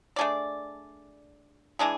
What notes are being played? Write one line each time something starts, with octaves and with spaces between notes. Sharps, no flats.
A3 D4 G#4 D5
E3 G#3 D4 G#4